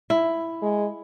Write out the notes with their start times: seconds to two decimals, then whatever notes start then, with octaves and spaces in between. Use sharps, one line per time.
0.10 E4
0.62 G#3